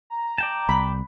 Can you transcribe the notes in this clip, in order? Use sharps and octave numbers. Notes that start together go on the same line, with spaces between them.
A#5
D5 G5 A5
C2 B5